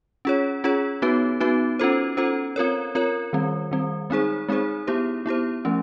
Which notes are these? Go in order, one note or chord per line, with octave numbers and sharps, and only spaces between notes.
C#4 F4 G#4 C#5
C#4 F4 G#4 C#5
B3 D#4 F#4 B4
B3 D#4 F#4 B4
C#4 F4 A4 C5
C#4 F4 A4 C5
C4 F4 A#4 C#5
C4 F4 A#4 C#5
D#3 G3 C4
D#3 G3 C4
G#3 C4 D#4 G#4 C5
G#3 C4 D#4 G#4 C5
B3 E4 G4 C5
B3 E4 G4 C5
F3 A3 C#4